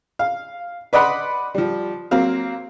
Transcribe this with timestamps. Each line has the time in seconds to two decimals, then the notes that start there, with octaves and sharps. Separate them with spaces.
0.19 F5
0.93 B4 D5 D#5 F#5 B5 C6
1.54 F3 G3
2.11 F#3 A#3 C4 F5